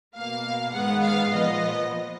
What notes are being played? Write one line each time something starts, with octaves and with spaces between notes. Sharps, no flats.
B2 A#3 F5
G#2 D#3 G#3 B3 F#5
F5
A#2 F3 B3 D#5